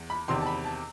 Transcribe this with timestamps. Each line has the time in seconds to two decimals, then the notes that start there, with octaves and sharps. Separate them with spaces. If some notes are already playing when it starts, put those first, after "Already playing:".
Already playing: E2
0.10 B5
0.28 E2 C3 D#3 C6
0.41 A5
0.46 B5
0.65 A5